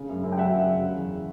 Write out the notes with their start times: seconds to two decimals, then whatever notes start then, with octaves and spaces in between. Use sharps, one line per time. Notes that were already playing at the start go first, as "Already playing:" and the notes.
Already playing: C#3
0.09 F#2
0.24 F#2
0.32 G5
0.38 F#3 E5 F#5
0.53 C#3
0.67 F#2
0.81 C#3
0.96 E2